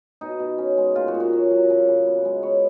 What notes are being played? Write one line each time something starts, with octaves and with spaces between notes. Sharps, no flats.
B2 D#4
B2
C#4
G#3
A#2 F4
F#4
A#2
F#4
C#4
F#3
C#3
C#3
B3
G#3
B3 C#5